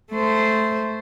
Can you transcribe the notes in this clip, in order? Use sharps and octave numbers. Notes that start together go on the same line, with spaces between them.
A3 C5